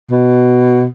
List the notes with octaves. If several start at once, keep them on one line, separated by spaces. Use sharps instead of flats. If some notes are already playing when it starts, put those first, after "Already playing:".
B2